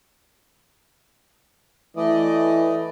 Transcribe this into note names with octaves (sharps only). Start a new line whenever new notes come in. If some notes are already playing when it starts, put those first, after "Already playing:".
E3 A3 D5 D#5